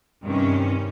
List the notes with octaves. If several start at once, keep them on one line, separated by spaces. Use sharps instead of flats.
G2 C3 D#3 C#4